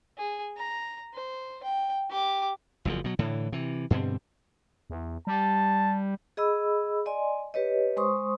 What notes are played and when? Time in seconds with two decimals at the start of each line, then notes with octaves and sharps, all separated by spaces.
0.18 G#4
0.57 A#5
1.14 C5
1.64 G5
2.10 G4 D6
2.85 F#1 E2 C#3 F3
3.04 B2 F#3
3.19 A2 D3 E3
3.52 C3 E3
3.90 G2 B2 D3 C4
4.90 E2
5.27 G3 A5
6.37 G#4 D#5 B5 E6
7.06 D5 D#5 G#5 C6
7.54 G4 B4 C#5 D#5
7.97 G#3 C5 C6 C#6 D#6